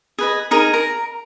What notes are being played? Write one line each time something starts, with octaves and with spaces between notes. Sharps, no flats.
G#4 B4 D#5
D#4 G#4 A#4
A#4 A#5